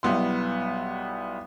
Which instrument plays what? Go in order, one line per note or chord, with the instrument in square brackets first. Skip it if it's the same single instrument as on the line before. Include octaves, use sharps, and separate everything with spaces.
[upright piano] B1 G3 B3 E4 C6